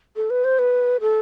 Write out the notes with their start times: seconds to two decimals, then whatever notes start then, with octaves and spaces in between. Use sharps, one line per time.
0.16 A4
0.30 B4
0.44 C5
0.59 B4
1.01 A4